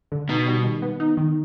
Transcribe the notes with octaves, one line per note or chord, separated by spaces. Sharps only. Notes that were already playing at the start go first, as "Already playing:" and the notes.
D3
B2 D#4
G3
D#3
B3
D#4
D#3